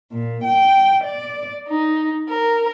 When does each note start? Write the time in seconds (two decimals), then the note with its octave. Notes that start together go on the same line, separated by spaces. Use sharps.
0.11 A#2
0.44 G5
1.04 D5
1.67 D#4
2.29 A#4